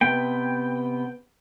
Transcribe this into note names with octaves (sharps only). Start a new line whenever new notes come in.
C3 B3 G5